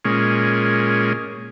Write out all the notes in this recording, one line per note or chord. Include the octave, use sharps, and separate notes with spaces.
A#2 G#3 C#4